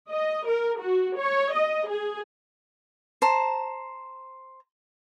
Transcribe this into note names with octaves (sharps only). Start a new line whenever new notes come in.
D#5
A#4
F#4
C#5
D#5
G#4
C5 A5 A#5